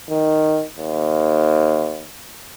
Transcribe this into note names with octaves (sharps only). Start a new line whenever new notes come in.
D#3
D#2